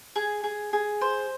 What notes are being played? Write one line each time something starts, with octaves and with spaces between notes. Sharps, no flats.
G#4
G#4
G#4
C5